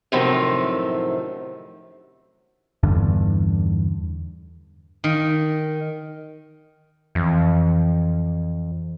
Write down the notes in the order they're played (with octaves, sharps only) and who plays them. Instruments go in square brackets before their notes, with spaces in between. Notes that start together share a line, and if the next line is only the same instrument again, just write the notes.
[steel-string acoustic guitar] F#2 A2 C3 D#3 F3
[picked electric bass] E2 G2 D3
[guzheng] D#3
[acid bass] F2 [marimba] E3